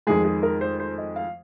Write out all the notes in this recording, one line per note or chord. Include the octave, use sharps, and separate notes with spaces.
F2 D#3 G#3 G#4
G#4
A#4
C5
C5
D#5
F5